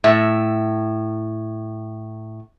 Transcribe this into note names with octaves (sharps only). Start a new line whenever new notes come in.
A2 E5